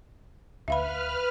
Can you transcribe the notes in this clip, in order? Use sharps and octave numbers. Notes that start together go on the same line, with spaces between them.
D2 B4 E5 F5 B5 F6